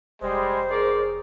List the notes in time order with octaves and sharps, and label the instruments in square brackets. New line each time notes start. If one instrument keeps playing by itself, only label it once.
[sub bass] F1 [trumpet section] G3 G#3 [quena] C5
[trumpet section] C#4 A#4 D5 [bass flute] G#4